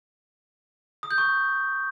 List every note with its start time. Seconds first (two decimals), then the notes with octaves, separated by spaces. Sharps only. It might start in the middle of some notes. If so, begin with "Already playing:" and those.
1.03 D#6
1.11 G6
1.18 C#6